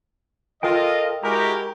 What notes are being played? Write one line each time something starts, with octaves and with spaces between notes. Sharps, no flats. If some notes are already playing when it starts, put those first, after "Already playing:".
F4 A4 A#4 D#5 G5
G#3 E4 F#4 G4 A#4 A#5